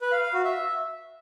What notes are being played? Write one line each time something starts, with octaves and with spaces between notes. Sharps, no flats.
B4
F5
F5
F#4
E5